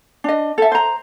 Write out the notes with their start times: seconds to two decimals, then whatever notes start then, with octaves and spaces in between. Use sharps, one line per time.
0.24 D4 D#5
0.58 A4 E5
0.72 C5 A#5